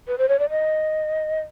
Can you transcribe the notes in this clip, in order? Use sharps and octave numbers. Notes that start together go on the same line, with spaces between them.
B4
C5
C#5
D5
D#5